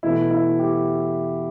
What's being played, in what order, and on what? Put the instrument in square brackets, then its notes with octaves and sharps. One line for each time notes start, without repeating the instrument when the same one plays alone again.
[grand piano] E2 B2 A3 E4
E4
G4